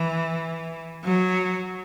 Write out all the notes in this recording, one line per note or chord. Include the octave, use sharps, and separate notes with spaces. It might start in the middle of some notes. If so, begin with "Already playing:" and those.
Already playing: E3
F#3